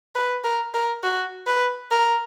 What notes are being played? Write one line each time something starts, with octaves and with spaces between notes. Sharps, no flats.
B4
A#4
A#4
F#4
B4
A#4